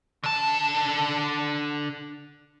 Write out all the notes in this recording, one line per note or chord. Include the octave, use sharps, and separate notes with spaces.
D3 A5